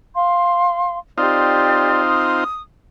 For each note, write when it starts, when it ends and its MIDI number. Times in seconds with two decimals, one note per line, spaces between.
0.14 0.98 77
0.14 0.98 84
1.18 2.44 60
1.18 2.44 63
1.18 2.44 65
1.18 2.01 67
1.18 2.01 74
2.09 2.60 87